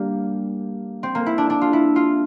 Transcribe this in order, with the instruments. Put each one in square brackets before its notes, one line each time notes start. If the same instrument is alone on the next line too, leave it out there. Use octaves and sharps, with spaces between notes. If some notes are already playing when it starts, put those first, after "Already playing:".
Already playing: [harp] G3 A#3 D4
C4
A#3
E4
D4
D4
F4
E4
F4